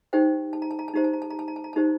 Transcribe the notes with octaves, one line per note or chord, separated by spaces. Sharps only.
D#4 G4 C5 G5
A5
A#5
A5
A#5
A5
D#4 G4 C5 A#5
A5
A#5
A5
A#5
A5
A#5
A5
A#5
D#4 G4 C5 A5